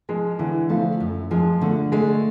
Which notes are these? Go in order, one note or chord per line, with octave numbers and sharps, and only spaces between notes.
F3 G#3
D3 E3
F3 A3
F#2
F3 G#3
D3 A3
G#3 A3